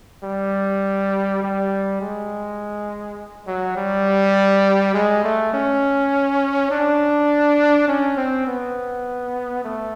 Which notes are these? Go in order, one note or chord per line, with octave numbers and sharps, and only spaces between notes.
G3
G3
G#3
F#3
G3
G#3
A3
C#4
D4
C#4
C4
B3
A3